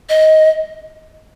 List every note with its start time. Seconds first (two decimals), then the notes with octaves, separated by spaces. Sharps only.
0.09 D#5